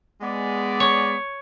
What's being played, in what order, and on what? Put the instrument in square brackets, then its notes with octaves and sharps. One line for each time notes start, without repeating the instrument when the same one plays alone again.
[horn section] G#3 B3 D5
[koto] C#5